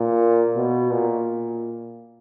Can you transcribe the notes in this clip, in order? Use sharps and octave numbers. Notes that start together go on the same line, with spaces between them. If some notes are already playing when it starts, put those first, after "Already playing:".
Already playing: A#2
B2
A#2